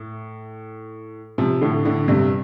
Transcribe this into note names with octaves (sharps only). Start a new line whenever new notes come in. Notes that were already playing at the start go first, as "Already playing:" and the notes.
Already playing: A2
C3 F3
A2 D3
A2 D3
G2 C3